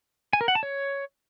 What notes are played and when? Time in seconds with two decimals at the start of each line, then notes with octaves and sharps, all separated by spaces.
0.33 G#5
0.41 A#4
0.48 F#5
0.55 A5
0.63 C#5